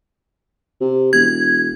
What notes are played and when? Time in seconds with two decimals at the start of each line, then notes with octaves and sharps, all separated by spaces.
0.81 C3
1.13 E1 G#6